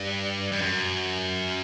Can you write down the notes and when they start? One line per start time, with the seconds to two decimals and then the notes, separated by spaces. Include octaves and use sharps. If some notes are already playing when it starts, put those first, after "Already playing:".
Already playing: G2
0.52 G2
0.61 F#2